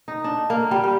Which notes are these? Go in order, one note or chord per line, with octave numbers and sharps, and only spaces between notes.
D#4
D4
A#3
G3
G4